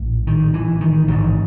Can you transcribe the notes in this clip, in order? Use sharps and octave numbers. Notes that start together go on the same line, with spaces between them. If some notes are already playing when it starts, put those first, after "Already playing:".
Already playing: A#1 A2
D#3
E3
D#3
A1 G#2 D#3